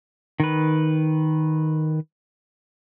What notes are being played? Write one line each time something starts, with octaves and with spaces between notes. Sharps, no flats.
D#3 B4